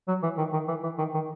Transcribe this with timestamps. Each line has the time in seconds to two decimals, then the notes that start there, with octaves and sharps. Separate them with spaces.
0.08 F#3
0.23 E3
0.38 D#3
0.53 D#3
0.68 E3
0.83 E3
0.98 D#3
1.14 D#3